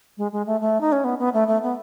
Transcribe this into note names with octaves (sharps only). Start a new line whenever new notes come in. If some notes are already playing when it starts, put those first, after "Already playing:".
G#3
G#3
A3
A3
D#4
C#4
B3
B3
A3
A3
B3